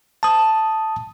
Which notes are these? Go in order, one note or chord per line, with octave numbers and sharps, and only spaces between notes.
A5 D#6